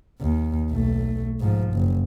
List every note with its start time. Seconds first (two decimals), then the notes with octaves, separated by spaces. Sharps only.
0.21 D#2
0.71 B1 A3
1.40 G#2 F3
1.74 F#1